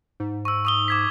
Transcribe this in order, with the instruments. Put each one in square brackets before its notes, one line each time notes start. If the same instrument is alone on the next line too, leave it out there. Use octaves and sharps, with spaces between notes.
[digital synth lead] G#2
[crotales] C#6 E6
C#6 D#6 G7
D6 G#6 B6